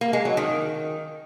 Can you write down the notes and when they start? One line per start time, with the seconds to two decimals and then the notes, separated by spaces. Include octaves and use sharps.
0.01 A#3
0.13 G#3
0.25 F#3
0.37 D#3